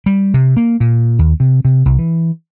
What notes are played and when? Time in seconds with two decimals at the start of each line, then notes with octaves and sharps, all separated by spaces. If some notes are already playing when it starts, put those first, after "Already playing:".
0.06 G3
0.34 C3
0.57 A#3
0.80 A#2
1.19 D#2
1.40 C3
1.65 C3
1.86 C2
1.99 E3